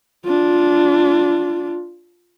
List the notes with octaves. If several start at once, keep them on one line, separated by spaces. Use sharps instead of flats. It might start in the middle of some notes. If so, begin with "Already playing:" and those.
D4 F4